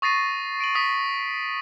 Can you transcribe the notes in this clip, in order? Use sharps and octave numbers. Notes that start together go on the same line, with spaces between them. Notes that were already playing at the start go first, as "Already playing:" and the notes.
C#6 D#6 A6 A#6 C7 D#7
D7 D#7 F#7
D#6 B6